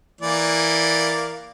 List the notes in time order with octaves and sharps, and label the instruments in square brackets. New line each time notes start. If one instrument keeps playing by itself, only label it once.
[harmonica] E3 A#3 D5